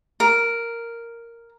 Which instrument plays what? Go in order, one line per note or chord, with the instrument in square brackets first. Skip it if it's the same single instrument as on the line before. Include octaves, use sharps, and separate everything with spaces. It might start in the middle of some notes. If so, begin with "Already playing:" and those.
[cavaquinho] A#4